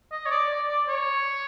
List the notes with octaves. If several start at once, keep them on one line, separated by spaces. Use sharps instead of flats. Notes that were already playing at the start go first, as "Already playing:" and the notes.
D#5
C#5
D5
D5
D5
C#5